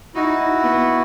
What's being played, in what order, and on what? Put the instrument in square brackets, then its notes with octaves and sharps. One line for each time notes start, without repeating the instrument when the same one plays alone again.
[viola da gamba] D#4 [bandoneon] E4 F#4
[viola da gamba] B3